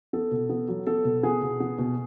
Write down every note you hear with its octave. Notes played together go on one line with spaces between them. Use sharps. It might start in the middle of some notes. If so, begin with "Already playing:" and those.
B3 A4
B2
B3
F#3
B3 A4
B2
B3 G#4
B2
B3
B2